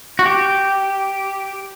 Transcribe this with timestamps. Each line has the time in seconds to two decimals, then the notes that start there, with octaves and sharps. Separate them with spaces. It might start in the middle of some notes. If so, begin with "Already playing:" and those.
0.19 F#4
0.26 G4